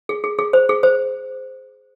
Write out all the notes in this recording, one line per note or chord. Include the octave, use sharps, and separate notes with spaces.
G#4
G#4
G#4
C5
G#4
C5